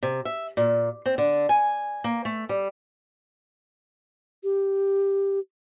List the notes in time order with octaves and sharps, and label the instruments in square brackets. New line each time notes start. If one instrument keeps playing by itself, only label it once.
[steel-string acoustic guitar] C3
E5
A#2
C4
D3
G#5
A#3
A3
G3
[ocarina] G4